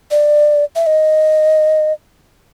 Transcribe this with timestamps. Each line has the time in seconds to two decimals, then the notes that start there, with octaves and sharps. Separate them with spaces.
0.11 D5
0.76 E5
0.86 D#5